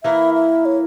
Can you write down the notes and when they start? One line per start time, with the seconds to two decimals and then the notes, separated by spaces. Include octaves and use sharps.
0.04 E3 A#3 E4 A#4 E5
0.34 E5
0.65 C#5